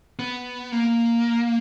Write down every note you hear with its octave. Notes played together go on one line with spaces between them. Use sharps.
B3
A#3